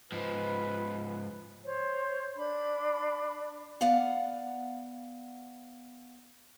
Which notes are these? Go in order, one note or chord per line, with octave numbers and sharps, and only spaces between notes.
G#2 F3 B4
C5 C#5
D4 B5
B3 D5 F5 F#5